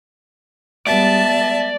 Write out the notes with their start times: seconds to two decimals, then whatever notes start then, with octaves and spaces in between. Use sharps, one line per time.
0.87 G3 G#3 B3 D5 E5 A5